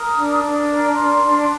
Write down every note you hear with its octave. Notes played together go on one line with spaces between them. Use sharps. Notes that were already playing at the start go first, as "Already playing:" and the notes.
Already playing: A#4 D#6
D4
D4
A#4
D4 C6
D4